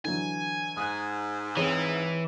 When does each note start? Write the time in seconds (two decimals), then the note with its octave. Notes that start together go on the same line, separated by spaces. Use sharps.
0.05 D3 E3 F#3 G#5
0.77 G#2 D#6 F#6
1.57 E3 C4 G#4 C#5